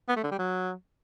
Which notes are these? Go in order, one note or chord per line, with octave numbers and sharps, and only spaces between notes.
B3
A3
D3
G3
F#3